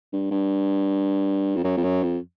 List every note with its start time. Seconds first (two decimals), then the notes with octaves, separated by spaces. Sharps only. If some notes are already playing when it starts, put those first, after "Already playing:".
0.13 G2
0.31 G2
1.56 F2
1.64 F#2
1.77 F2
1.84 F#2
2.03 F2